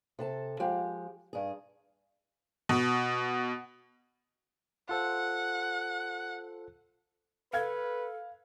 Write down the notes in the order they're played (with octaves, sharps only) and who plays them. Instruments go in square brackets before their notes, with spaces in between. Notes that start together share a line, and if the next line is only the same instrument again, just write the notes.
[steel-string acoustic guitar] C3 A4 A5
F3 G#3 G4
G2 G#4
[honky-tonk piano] B2
[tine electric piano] F4 A4 C5 [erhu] F#5
[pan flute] A4 [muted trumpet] B4 [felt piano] F5 G#6